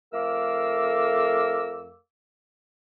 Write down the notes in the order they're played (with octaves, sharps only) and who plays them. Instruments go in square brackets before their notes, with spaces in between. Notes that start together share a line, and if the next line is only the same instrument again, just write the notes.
[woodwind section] F2 A3 A#4 F5 D6 E6